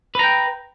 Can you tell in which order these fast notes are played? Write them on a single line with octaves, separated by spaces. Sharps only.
B4 A#5 G5